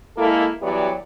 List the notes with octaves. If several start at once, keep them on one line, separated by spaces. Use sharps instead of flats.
G#3 A#3 E4 A4
E3 F#3 G3 B3 G4 D5